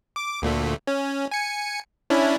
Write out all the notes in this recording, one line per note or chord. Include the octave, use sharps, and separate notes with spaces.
D6
D2 A#2 A3
C#4
G#5 C#7
C#4 D4 E4